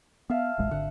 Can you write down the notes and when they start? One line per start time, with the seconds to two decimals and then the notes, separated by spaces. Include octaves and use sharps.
0.30 B3 E5 F5 A5
0.58 D#1 A1 G#3
0.71 G#1 D3 F#5